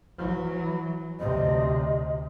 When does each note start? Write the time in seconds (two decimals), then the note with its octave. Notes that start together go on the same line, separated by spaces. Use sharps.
0.18 E3 F#3
1.20 D2 C3 D#5